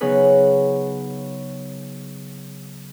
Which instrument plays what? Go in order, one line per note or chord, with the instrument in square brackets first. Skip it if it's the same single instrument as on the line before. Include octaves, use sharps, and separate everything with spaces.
[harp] C#3 F#3 B3 D#4 G#4 B4